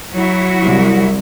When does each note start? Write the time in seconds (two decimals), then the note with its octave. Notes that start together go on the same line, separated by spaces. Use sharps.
0.13 F#3 E4 F#4
0.63 C2